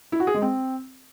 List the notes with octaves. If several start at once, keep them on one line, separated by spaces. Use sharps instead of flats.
E4
F#4
G#4
G#3
C4